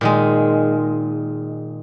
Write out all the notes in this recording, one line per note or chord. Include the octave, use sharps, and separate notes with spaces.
A#2 D#3 G#3